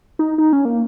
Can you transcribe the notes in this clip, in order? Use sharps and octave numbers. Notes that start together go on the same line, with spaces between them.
D#4
D#4
C#4
A#3